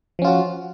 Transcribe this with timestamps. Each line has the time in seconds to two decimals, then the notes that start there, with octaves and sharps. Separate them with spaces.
0.19 F3
0.22 C#4
0.24 F4
0.27 F#4